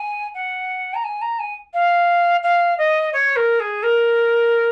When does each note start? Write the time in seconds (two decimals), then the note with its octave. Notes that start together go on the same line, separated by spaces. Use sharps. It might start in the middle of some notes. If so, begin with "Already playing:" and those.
Already playing: G#5
0.34 F#5
0.94 A#5
1.04 G#5
1.21 A#5
1.39 G#5
1.73 F5
2.42 F5
2.78 D#5
3.12 C#5
3.36 A#4
3.59 G#4
3.82 A#4